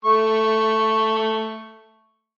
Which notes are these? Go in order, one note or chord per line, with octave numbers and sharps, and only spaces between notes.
A3 C#6